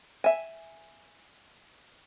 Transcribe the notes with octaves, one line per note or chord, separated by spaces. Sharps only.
E5 G#5